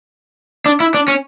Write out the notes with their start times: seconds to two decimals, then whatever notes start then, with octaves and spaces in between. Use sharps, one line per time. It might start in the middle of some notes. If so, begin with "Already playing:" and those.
0.66 D4
0.80 E4
0.94 D4
1.08 C#4